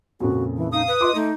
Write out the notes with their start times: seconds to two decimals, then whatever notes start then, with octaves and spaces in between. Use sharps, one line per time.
0.20 F2 A#2 C#3 F#4
0.57 E3
0.73 D#4 F5 D#6
0.88 B4
1.01 F4 D#5 C6 D6
1.15 A3 D#4